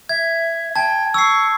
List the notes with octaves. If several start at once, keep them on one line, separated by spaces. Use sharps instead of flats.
E5 G#6
G5 A5 G#6
C#6 E6 C7